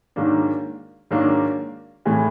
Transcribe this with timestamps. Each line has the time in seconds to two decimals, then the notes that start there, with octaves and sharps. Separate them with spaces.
0.16 G#2 D#3 F#3 A#3 D4
1.11 G#2 D#3 F#3 A#3 D4
2.05 A2 E3 G#3